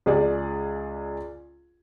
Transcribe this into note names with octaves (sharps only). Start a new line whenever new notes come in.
C#2 G#4 D5